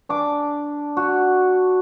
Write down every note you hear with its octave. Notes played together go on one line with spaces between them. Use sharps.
D4 D6
F#4